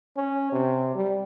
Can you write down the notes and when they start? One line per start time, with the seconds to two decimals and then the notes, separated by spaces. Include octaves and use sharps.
0.16 C#4
0.52 C3
0.95 G3